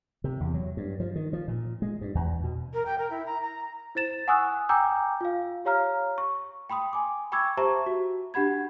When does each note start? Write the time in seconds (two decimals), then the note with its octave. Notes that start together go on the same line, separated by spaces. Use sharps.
0.24 C3
0.40 E2
0.54 F#3
0.77 G2
1.00 F3
1.16 D#3
1.33 F3
1.48 A#2
1.82 G#3
2.01 G2
2.15 E2
2.44 B2
2.73 A#4
2.86 G5
2.98 A#4
3.10 E4
3.26 A#5
3.41 A#5
3.95 E4 C5 A6 E7
4.28 F#5 G#5 C#6 D#6 E6 F#6
4.69 G5 G#5 A#5 D6 E6 G6
5.21 F4 F5
5.65 G4 C#5 F5 A#5 F6
6.18 C#6
6.70 G5 B5 C6 D#6
6.93 G#5 D6
7.32 G5 B5 C#6 D6 E6 G#6
7.57 G4 C5 E5 A5 A#5 C#6
7.86 F#4
8.34 D4 G4 F#5 B5 G#6